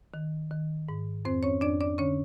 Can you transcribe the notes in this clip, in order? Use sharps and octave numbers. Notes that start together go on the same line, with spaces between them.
D#3
D#3
G#2
F2 C4 C5
C#4 C#5
F2 D4 D5
D4 D5
D3 C#4 C#5